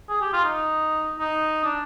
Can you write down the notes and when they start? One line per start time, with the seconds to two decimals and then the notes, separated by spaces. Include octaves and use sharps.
0.09 G#4
0.21 G4
0.33 F4
0.44 D#4
1.20 D#4
1.64 D4